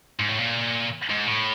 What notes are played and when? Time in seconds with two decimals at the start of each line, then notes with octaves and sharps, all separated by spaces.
0.19 G#2
0.29 A2
0.39 A#2
1.10 G#2
1.27 A2